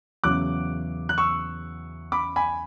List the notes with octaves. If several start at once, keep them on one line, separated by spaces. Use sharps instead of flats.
E2 C#3 F#3 D6 F#6
F#6
C#6 E6
B5 D6
G#5 B5